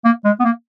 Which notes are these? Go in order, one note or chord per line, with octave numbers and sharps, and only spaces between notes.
A#3
G#3
B3
A#3